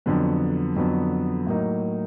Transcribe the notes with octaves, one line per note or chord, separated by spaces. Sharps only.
F2 D3 F#3 B3
F2 D3 F#3 B3
A2 F#3 A#3 D#4